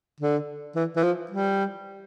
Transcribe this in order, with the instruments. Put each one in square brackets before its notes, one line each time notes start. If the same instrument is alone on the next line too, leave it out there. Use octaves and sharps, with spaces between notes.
[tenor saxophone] D3
E3
E3
F3
G3